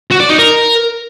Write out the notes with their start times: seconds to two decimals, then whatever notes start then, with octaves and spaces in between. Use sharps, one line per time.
0.11 F#4
0.20 D5
0.29 D#4
0.38 A#4